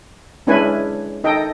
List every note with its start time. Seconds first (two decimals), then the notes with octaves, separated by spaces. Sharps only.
0.47 G#3 C#4 D4 E4 B4 G#5
1.24 D#4 A4 D#5 G5